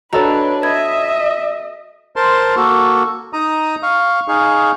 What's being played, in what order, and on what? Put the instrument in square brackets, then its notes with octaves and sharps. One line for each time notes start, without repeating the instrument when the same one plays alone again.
[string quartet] D4 B4 [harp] F#4 A4 C#5 [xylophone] D#5 A#5
[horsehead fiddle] D#5 [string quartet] E5 [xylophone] B5 G#6
[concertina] A#4 C5 A5 C6
A#3 F#4 A4 C#6
D#4 A#5 D#6
F5 C#6
D#4 G#4 F5 C#6